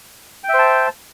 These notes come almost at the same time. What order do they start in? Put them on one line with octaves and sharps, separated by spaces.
G5 E5 C5 A5